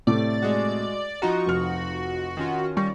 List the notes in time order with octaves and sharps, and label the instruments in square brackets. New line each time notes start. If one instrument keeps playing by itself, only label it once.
[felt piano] A2 C3 A3 [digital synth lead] D5
[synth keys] G#3 F#4
[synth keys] F3 D#4 F4 [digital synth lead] F#4 [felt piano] A#5
[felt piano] F1 F6
[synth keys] D#3 C#4 F4
[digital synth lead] G3 [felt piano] C#6 A#6